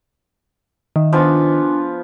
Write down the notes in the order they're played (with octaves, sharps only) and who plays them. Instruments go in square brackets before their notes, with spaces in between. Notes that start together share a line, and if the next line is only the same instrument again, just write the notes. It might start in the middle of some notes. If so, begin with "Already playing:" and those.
[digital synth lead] D#3 [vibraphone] E5
[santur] F3 B3 [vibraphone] D4 G#5